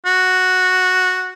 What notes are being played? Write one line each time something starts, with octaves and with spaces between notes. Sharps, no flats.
F#4